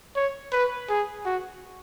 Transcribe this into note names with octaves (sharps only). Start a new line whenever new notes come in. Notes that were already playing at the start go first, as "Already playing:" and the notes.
C#5
B4
G#4
F#4